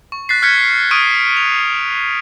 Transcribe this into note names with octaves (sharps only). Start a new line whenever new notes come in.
C#6
F#6 A6 B6 C7
F6 F#6 G#6 B6 C#7
C#6 D#6 F6 F#6 D7 D#7
F7